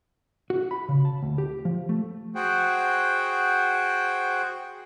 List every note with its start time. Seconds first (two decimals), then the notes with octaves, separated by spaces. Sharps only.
0.50 F#4
0.71 B5
0.89 C#3
1.05 A5
1.23 D2
1.38 G4
1.65 F3
1.89 A3
2.35 F#4 G#4 C5 F#5 G5